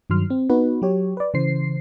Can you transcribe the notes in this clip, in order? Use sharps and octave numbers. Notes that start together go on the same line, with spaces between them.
G2 D#3 F#3 C6 F6
C4
B3 D#4 F#4 B4
F#3 G4 C#5
B4 D5
C#3 E3 C5 C7